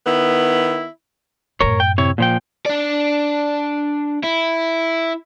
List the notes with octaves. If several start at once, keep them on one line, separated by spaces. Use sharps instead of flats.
D#3 B3 E4
F#2 A2 A#4 C#5
G5
C3 E4 C#5
A#2 F3 G5
D4 D5
E4